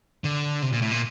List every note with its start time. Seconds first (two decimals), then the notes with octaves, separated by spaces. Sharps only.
0.24 D3
0.62 C3
0.72 A#2
0.82 A2
0.91 A#2